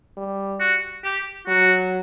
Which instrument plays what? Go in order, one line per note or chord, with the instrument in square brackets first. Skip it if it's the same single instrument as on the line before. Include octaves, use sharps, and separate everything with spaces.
[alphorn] G3
[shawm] F#4
G4
[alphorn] F#3 [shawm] F#4